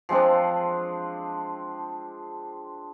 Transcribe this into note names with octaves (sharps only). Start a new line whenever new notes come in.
F3 G#3 C4 D4